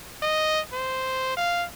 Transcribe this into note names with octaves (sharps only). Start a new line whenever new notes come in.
D#5
C5
F5